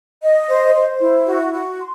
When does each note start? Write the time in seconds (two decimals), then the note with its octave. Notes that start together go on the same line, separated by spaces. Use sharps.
0.23 D#5
0.48 C5
0.74 C5
1.01 E4
1.27 F#4
1.53 F#4
1.79 C6